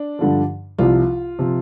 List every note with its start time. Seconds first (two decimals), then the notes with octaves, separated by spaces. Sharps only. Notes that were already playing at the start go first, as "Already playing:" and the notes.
Already playing: D4
0.19 G2 D3 F3
0.79 C2 C3 F3 F4
1.39 C3 F3